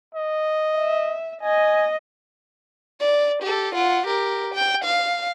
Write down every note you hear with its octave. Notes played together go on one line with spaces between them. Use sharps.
D#5
E5
D#5 G#5
D5
G4 A4
F4 F#5
G4 A#4
G5
F5